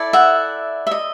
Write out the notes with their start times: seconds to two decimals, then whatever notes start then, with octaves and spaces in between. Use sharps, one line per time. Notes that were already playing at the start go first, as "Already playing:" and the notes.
Already playing: E4 A4 D5
0.13 E5 F#5
0.87 E5
0.91 D#5